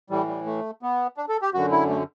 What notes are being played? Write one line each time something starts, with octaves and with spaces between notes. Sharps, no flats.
A2 E3 G3
G3
A3
B3
D4
A4
G4
F#2 D3 F#4
E4
A3